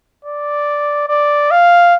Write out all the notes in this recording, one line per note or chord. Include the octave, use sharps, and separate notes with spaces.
D5
D5
F5